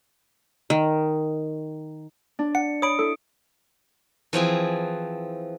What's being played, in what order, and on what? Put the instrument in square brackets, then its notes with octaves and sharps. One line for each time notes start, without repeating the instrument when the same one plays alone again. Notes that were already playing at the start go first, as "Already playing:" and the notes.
[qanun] D#3
[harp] D4
[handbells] F#5 [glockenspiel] C#7
[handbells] C#5 B5 [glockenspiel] D#6 D7
[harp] E4 [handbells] A4
[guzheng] E3 F3 C4 G#4